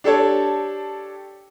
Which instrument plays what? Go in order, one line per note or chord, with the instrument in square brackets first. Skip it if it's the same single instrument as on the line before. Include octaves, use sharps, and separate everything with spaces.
[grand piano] D4 G4 A4 C#5